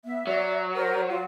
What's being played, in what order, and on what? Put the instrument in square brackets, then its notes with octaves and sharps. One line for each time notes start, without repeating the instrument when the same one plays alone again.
[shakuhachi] B3 [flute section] E5
[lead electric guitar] F#3 [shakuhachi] D5
[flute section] A#4 [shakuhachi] C5
[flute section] F4